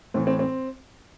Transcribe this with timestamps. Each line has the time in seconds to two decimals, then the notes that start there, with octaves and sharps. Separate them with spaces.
0.14 A2 C4
0.17 E3
0.27 C4
0.39 C4